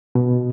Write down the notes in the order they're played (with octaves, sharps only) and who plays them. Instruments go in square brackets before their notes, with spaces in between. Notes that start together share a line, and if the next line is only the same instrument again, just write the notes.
[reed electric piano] B2